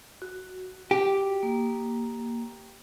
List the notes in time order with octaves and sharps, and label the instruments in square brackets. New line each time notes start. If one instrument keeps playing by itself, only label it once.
[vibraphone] F#4
[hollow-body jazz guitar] G4
[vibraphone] A#3